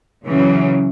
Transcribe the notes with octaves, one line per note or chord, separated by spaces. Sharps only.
C#3 E3 F#3